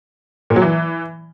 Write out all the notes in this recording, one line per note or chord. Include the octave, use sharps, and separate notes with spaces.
A#2
F#3
E3